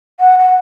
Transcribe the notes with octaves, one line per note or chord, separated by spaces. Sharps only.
F#5
F#5